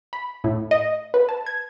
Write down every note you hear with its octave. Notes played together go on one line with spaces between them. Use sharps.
B5
A2
D#5
B4
A5
G#6